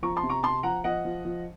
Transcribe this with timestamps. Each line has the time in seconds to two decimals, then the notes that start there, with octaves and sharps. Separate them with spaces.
0.02 F3 A#5 C#6
0.16 A5 C6
0.23 C3
0.29 A#5 C#6
0.43 C3 A5 C6
0.63 F3 F#5 A#5
0.84 F3 D#5 F#5
1.05 F3
1.25 F3